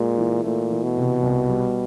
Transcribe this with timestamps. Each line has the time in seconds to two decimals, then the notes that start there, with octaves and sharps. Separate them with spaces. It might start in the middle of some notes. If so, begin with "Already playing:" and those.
Already playing: A#2 G#3
0.18 E3
0.44 A#2 A3
0.70 E3
0.83 B2
0.97 C3
1.23 C2
1.49 G3